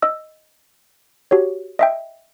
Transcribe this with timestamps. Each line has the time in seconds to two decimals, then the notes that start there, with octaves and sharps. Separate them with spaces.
0.02 D#5 E6
1.31 F#4 G4 C#5
1.79 D#5 E5 G5